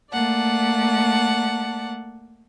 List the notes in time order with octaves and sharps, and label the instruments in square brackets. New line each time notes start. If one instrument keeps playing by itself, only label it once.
[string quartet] A3 A#3 D5 F#5 A5